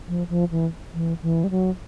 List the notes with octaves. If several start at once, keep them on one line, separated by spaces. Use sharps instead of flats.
F3
F3
E3
E3
E3
G3
F#3